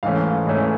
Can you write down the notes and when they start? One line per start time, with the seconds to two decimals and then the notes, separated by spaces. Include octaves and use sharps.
0.03 G#2 E3 A3 C#4 F5
0.47 G#2 E3 A3 C#4